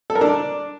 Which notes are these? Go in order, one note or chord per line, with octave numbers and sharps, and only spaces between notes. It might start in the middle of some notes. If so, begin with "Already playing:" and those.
A4
A#4
D4